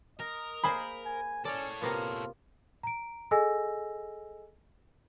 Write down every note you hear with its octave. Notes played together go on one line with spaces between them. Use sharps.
A#4 D#5 A#5
A#3 G#4 C5 B5
G#5
C#4 A4 C#5 D5
C3 A#3 B3 F4
A#5 D7
G#4 A4 D#5 G#5 E6 A#6